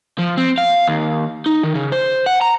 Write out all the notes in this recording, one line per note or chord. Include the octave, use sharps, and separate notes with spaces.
F3
C4
F5
D#2
D#4
D#3
C#3
C5
F#5
A#5